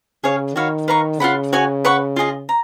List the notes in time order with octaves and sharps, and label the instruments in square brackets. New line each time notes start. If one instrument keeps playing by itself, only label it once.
[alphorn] C#3 [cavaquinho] G#4 C#5 F5
[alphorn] D#3 [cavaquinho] F#4 C#5 F5 B5
[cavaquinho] B4 F5 A#5 C#6
[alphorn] C#3 [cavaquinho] F4 B4 F#5 B5
[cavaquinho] F#4 C#5 G#5
B4 F#5 C#6
F4 G#4 D#5
A#5